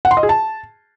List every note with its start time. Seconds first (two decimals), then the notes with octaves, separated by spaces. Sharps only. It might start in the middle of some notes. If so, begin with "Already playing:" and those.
0.05 F#5
0.11 C6
0.17 D#5
0.23 G#4
0.29 A5